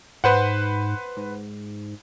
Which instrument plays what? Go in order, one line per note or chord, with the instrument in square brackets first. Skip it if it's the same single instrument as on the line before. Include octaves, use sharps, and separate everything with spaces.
[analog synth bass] G#2 [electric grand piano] B4 C5 F#5
[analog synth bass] G#2